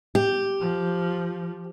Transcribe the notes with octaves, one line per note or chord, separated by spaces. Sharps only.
G4
F3